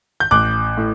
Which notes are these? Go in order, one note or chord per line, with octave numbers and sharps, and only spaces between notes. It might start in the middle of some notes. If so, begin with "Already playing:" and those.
G6
A1 D6 F#6
A2